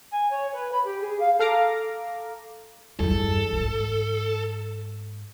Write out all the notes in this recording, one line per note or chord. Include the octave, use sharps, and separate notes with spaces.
G#5
C#5
B4
B5
G4
G#4
F5
A4 F5 A#5 D6
E2 G2 A4
G#2